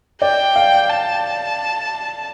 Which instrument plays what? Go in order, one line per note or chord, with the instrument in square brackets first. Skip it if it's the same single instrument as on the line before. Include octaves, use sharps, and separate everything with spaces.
[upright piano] D5 [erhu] G5
[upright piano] F5
[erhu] A5